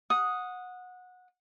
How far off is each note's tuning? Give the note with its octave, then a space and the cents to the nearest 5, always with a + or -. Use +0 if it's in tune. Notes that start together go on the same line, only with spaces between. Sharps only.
F#5 -20 D#6 +0